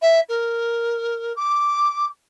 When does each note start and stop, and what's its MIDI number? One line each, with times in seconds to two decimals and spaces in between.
0.02 0.20 76
0.29 1.33 70
1.36 2.06 86